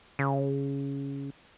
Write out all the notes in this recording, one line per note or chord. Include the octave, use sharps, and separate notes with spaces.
C#3